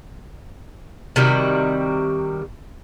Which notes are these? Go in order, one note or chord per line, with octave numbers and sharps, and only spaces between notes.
C3 D#3 G3 F#4